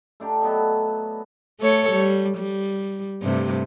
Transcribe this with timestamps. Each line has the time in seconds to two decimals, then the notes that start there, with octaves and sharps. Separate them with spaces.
0.20 A3 D4 G4 A#5
0.42 F#3 B3 A4 D#5
1.60 A3 A4 C#5
1.91 G3
2.37 G3
3.22 G2 C3 A3